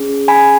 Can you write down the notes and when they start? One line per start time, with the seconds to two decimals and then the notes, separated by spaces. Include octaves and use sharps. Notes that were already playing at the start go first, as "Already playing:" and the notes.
Already playing: C#4 G#4
0.28 G#5 B5